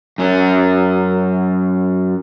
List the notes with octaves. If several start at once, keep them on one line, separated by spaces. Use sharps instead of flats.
F#2 C#4